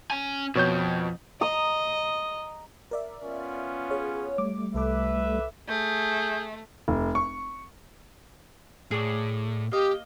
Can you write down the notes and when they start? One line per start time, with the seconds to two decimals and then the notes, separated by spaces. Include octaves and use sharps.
0.10 C#4 G#5
0.55 F2 B2 C#5 G6
1.41 D#5 A#5 D#6
2.91 A#4 D5 E5
3.23 B3 C#4 F4
3.91 G#4 C#5
4.38 G3 A3 D6
4.74 C2 A4 B4 E5 D6
5.68 A3 G#4 G6
6.88 F1
7.15 C#6
8.91 A2 G#4 D5
9.72 A#3 G4 D#5